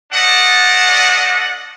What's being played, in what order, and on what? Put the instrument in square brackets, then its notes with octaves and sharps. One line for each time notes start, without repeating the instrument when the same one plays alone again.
[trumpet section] A3 D4 D5 D#5 F#5